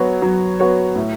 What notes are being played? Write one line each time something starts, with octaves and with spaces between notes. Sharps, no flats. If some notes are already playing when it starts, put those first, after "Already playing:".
Already playing: F#3 B3 F#4 C#5
F#3
B3 F#4 C#5
A2